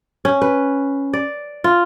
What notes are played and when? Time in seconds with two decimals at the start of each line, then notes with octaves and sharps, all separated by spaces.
0.25 C#4
0.42 B4
1.13 D5
1.64 F4